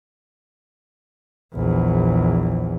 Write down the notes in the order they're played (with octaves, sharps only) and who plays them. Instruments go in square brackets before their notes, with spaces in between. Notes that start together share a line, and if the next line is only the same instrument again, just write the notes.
[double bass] A#1 E2